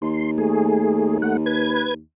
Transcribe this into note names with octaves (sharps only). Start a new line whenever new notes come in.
D#2 C6
A3 G#4
A3 F#5
B4 G#6